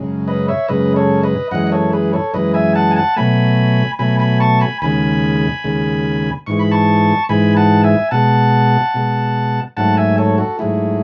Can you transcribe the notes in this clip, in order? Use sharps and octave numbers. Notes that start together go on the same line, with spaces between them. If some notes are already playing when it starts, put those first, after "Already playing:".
Already playing: F#2 C#3 G#3
B4 D#5
C#5 E5
F#2 C#3 G#3 B4 D#5
A4 C#5
B4 D#5
F#2 E3 G#3 D#5 F#5
D#5
A4 C#5
G#4 B4
A4 C#5
F#2 E3 G#3 B4 D#5
E5 G#5
F#5 A5
G#5
F#5 A5
B2 F#3 A3 G#5 B5
B2 F#3 A3 G#5 B5
G#5 B5
A5 C#6
G#5 B5
D#2 C#3 G#3 G#5 B5
D#2 C#3 G#3
G#2 E3 G#3 C#6
B5
A5 C#6
G#2 E3 G#3 G#5 B5
F#5 A5
E5 G#5
B2 G#3 F#5 A5
B2 G#3
G#2 F#3 A3 F#5 A5
E5 G#5
A4 C#5
F#4 A4
G#2 F#3 A3 E4 G#4